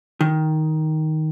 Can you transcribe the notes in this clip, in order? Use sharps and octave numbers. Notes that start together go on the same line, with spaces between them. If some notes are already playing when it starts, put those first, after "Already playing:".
D#3